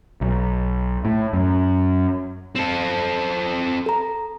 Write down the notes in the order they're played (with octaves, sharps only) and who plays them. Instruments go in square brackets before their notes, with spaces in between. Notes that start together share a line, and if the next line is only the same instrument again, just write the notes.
[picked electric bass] B1
A2
F#2
[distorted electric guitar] C4 A4
[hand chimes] A4 A#5